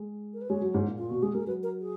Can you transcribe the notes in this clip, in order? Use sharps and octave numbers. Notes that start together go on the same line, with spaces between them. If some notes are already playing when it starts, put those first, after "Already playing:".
Already playing: G#3
A#4
B4
G#3 C#5
F#3
G#2
A#2
A#2 F4
B2 F#4
G#3 G#4
G#3 A#4
F#3 B4
A#4
G#4